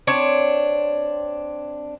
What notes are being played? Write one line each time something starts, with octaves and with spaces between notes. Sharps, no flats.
C4 D4 C#5